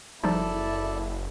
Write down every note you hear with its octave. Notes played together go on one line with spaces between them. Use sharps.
F#1 F3 G3 D#4 E4 A4 D5 A5